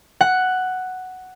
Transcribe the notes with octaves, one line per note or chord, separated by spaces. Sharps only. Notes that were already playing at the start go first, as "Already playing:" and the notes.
F#5